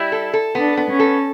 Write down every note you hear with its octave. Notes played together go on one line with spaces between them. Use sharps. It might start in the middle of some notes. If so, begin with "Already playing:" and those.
Already playing: G3 E4
A4
A4
B3 D4
B3
C#4
A4